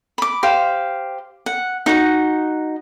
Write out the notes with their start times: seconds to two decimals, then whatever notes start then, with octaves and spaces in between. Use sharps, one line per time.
0.18 B5 D6
0.43 G4 C5 F5
1.46 F#5
1.86 D#4 F#4 F#5